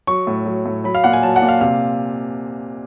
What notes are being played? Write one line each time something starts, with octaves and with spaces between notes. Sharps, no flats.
F#3 C#6
A2
F#3
A2
F#3 B5
F5
A#2 F#5
G#5
F#3 A5
F#5
A#2
F5
C3 F5